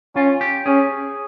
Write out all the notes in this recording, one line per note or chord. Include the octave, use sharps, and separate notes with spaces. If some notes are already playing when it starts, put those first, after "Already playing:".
C#4 F4
G4
C#4 G#4